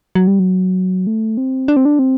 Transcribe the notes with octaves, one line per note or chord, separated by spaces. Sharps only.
F#3
G3
F#3
A3
C4
D4
C4
D4
C4